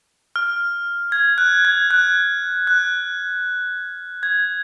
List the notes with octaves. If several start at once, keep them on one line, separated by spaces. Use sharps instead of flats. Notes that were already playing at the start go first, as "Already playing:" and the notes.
F6
G#6
F#6
G#6
F#6
F#6
G#6